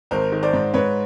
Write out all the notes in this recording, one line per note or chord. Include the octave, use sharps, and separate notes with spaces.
G#1 A#4 C5
D#3
C5 D5
G#2
G#2 B4 C#5